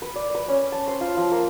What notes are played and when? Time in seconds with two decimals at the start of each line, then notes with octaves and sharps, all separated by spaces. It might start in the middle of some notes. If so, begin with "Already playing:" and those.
0.02 B4
0.16 D5
0.35 B4
0.48 C#4
0.72 A5
0.88 C5
1.01 F4
1.17 F3
1.31 A#3